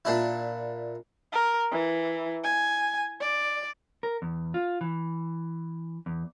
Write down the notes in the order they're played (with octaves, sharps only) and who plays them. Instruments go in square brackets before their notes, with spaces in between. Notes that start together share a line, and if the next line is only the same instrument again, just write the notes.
[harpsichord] A#2 D4 E4
[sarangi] A#4
E3
G#5
D5
[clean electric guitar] A#4
E2
F4
E3
E2